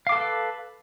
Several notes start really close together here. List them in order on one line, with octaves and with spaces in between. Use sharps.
F5 D6 A4 B4